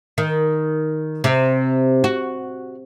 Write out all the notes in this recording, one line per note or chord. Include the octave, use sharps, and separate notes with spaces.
D#3
C3
F#4